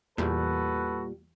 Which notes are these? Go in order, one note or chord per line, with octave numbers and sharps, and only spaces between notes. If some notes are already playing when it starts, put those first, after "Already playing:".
E2 A#2 G3 F#4 A4 B4